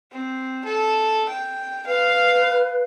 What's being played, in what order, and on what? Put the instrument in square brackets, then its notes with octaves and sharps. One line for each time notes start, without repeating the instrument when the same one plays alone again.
[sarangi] C4
A4
G5
[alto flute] B4 [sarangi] F5